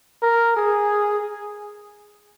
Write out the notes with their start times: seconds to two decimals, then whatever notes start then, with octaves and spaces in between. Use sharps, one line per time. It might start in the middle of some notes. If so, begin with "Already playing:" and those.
0.22 A#4
0.57 G#4